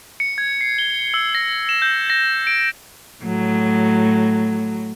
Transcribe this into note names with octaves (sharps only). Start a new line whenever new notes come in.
C#7
G#6
C7
G7
E6
A#6
E7
G6
A#6
D7
A2 F#3